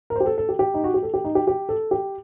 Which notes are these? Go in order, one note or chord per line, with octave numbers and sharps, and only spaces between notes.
A#4
G4 C5
A4
A4
G4
G4
D#4
F#4
G4
A4
G4
D#4
G4
G4
A4
G4